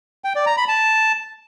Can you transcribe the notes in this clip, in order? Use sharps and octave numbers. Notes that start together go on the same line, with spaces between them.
G5
D5
A#5
B5
A5